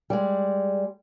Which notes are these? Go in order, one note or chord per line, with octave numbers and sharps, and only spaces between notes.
G3 G#3